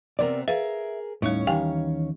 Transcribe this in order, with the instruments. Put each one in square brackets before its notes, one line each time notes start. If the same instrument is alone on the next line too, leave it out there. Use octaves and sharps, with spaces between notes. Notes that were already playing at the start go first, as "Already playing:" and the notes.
[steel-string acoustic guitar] C3 B3 C4 [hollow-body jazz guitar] A#4 C5 D5
[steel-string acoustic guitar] G#4 A#4 [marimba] B4 F5 [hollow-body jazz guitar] E5
[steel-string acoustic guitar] D#2 C#4 C#5 [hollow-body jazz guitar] A2 [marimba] G3 D#4 E5
[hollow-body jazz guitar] D#3 E3 F5 [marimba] G4 G5 G#5